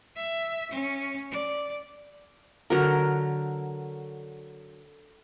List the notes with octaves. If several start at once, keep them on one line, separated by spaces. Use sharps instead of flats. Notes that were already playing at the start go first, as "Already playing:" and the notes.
E5
C#4
D5
D3 F#3 A#4